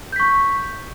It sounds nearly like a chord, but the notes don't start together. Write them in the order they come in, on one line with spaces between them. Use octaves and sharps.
G6 B6 C#6